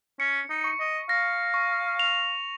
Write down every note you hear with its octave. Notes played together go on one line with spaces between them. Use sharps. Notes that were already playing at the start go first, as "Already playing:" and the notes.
C#4 C#7
D#4
C#6
D#5
F5 A#6
C#6
F7